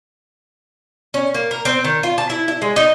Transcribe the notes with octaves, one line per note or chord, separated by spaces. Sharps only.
C#4
A#3
A#4
C4
D#3
F4
A5
E4
E4
G#3
D#4